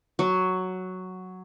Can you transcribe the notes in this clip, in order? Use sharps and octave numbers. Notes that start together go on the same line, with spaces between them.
F#3